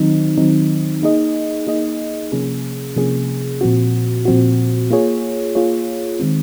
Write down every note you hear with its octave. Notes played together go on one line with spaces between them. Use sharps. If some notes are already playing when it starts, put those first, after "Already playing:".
Already playing: D#3 F#3 C4 D#4
D#3 F#3 C4 D#4
A#3 D#4 G#4 D#5
A#3 D#4 G#4 D#5
C3 F3 A#3 C#4 G#4
C3 F3 A#3 C#4 G#4
A#2 F3 C4 F#4
A#2 F3 C4 F#4
A#3 F4 G#4 C#5
A#3 F4 G#4 C#5
D#3 G#3 C4